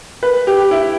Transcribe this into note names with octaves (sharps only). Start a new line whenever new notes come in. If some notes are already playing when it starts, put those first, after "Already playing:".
B4
G4
E4